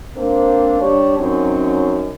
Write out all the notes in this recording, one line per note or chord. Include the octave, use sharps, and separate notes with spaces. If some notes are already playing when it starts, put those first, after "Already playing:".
A#3 C4 D4 A#4 C5
G3 D4 G4 C#5
F#2 F#3 C4 C#4 D#4